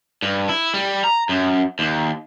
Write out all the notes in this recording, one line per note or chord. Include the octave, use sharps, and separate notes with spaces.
G2
E4
G3
A#5
F#2
D#2